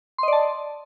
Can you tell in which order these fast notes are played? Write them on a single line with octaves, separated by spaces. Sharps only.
C6 D#5 D5 A5